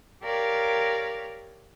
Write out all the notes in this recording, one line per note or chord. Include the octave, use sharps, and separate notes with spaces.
G4 A#4 C#5 D5 F5